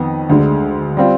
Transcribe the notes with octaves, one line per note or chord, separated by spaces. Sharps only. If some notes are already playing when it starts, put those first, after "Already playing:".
Already playing: F2 D#3 B3
D2 D3 G#3
G3 C4 F4